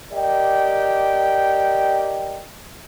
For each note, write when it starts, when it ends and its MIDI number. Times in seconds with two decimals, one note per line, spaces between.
0.12 2.42 67
0.12 2.42 70
0.12 2.42 74
0.12 2.42 75
0.12 2.42 79